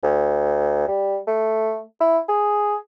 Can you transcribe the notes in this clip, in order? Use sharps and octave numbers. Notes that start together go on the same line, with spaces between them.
D2
G3
A3
E4
G#4